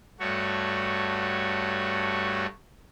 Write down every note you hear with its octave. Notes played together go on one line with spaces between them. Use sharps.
G2 A3 F#4 C#5